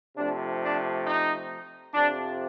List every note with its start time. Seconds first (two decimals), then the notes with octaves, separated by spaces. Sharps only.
0.16 C3 F3 A3 D4
0.61 D4
1.05 D#4
1.93 F2 C3 F3 D4